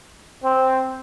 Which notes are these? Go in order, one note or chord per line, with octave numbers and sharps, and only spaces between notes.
C4